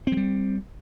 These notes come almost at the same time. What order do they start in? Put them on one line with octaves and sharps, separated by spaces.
C4 F#3 G3